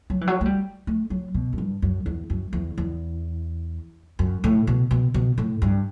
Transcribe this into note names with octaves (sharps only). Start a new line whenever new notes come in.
F#3
E3
F#3
A3
G3
A3
F#3
B2
F#2
G2
F#2
E2
F#2
E2
E2
F#2
A2
B2
B2
B2
A2
G2